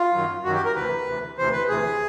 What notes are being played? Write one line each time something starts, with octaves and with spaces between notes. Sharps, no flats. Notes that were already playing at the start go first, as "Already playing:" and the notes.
Already playing: F4
F#2 D#3 F#3
F#2 D#3 F#3 F#4
G4
A#4
D2 C3 E3 B4
D2 C3 E3
D2 C3 E3 C5
B4
D2 C3 E3 G#4